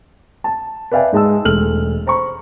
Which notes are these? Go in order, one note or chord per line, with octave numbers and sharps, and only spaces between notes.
A5
B4 D5 E5 F5 G5 G#5
G#2 G#3 A5 E6
E1 A3 F6 F#7
C5 A#5 B5 C#6